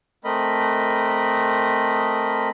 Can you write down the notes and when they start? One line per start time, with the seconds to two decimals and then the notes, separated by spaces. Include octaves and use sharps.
0.24 A3 C4 A#4 D#5 B5